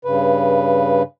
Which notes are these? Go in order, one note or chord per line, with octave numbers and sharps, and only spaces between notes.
G2 C#3 B4